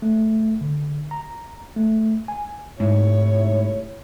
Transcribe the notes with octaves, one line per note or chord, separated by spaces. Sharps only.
A3
D3
A#5
A3
G#5
G#2 C3 A3 E4 C#5